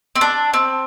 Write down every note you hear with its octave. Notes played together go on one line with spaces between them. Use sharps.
C4
D4
C4